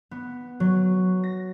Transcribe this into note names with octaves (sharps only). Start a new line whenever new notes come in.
B3
F#3
A#6